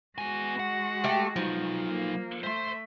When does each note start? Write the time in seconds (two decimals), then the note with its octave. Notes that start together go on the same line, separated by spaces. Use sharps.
0.18 G#3 B3 F#4 G#5
0.60 F#5
1.04 A3 G4
1.36 F3 F#3 D#4
1.89 A#3
2.44 A3 C5 E5 C6